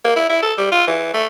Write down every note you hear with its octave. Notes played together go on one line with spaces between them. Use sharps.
A#3
E4
E4
A4
G3
F4
E3
A3